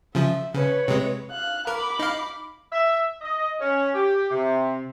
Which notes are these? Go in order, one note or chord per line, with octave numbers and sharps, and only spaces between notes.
C#3 F3 E5
C#3 B4 C#5
C3 G#3
F5 F#6
A#4 B5 D6
D#4 F5
E5
D#5
C#4
G4
C3